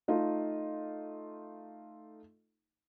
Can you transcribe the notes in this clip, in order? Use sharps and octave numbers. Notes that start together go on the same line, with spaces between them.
A3 D#4 F4